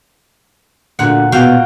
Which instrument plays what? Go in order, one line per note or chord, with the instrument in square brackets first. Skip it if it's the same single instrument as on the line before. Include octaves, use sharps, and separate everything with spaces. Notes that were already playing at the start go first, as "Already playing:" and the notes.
[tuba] D2 [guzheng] A#2 F#5
[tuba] B2 [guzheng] F#4 F5 G5